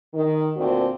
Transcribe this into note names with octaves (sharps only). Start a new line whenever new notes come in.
D#3
D2 A#2 C4 D4 F#4